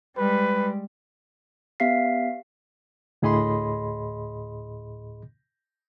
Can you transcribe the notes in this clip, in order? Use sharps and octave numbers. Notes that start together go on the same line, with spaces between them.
G3 G#3 B4
B3 G4 E5 F5 B6 C7
D2 A2 G#4 D#5 B5 C6